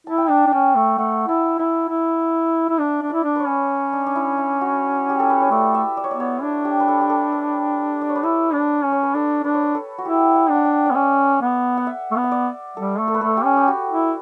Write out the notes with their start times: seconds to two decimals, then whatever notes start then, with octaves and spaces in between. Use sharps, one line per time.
0.07 E4 A5
0.18 G5
0.28 D4 A5
0.47 D4
0.52 C#4 G5
0.75 A3
0.98 A3 F#5
1.28 E4 A5
1.59 E4 B5
1.89 E4
2.69 E4
2.79 D4 E5
3.02 D4
3.10 E4 D5
3.24 D4
3.36 B4 C#5
3.47 C#4
3.93 D4
4.06 D4
4.16 E4
4.38 E4
4.61 F#4
5.09 G4
5.20 A4
5.30 B4
5.41 C#5
5.51 A3 D5
5.75 E5
5.97 D5
6.04 C#5
6.11 B3 D5
6.20 C#5
6.43 D4
6.65 G4
6.80 B4
6.88 A4
7.01 G4
7.10 A4
7.32 B4
8.01 D5
8.09 C#5
8.16 B4
8.23 E4 A4
8.53 D4
8.84 C#4
8.92 C#5
9.03 B4
9.15 D4 A4
9.44 D4 B4
9.54 C#5
9.63 B4
9.75 A4
9.98 F#4
10.05 E4 G4
10.35 F#5
10.50 D4
10.55 F#5
10.65 G5
10.86 D5
10.91 B3
10.95 C#4 E5
11.41 B3
11.77 F#5
11.87 E5
12.12 A3
12.17 B3
12.24 E5
12.32 D5
12.77 G3 A4
12.99 A3
13.08 A4
13.14 B4
13.21 A3 A4
13.37 G4
13.44 C#4
13.57 G4
13.68 F#4
13.90 E4